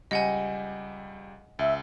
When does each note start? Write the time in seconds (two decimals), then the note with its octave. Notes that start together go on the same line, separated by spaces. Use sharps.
0.11 C#2 G3 D#5 F#5 G#5
1.59 C#2 E5